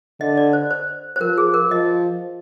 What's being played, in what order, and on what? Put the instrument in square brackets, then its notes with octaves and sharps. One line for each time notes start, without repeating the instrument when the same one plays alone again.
[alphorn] D3 [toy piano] D#5
[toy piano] D5
C5
C5
C5
[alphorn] F3 [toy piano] A#4
[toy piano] G#4
A#4
[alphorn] F3 [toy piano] D#5